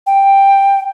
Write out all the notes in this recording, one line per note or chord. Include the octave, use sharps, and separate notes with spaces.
G5